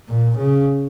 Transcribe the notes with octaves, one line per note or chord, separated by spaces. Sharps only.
A#2
C#3